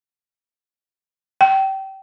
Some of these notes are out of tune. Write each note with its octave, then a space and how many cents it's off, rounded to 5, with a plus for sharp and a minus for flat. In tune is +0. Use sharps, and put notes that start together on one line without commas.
G5 -25